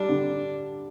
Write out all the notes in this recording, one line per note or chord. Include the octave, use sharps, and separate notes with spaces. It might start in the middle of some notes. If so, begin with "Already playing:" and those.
Already playing: G3 D4
D3